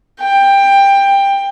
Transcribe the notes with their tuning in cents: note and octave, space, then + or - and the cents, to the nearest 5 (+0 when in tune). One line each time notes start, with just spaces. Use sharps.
G5 +15